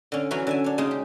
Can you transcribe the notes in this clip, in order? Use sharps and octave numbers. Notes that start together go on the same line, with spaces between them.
D3 C#4
E3 F#3 C#4 F#4
D3 E5 G#5
D4 C#5
C#3 G#3 D#4
G4